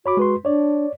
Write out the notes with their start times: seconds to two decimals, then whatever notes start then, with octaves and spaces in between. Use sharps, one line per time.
0.06 F#4 C#5 B5 D6
0.17 G#3 B4 C6
0.45 D4 C#5 D5